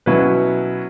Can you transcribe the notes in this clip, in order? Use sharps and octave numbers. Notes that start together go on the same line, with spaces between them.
B2 F#3 C#4 E4 B4